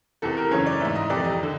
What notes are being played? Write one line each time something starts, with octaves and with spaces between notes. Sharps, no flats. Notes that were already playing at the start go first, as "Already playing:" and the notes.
E2 C3 E3 A4
A#4
F#2 C#3 E3 C#5
D5
G#2 E3 E5
D#5
F2 C3 E3 D5
D#5
D3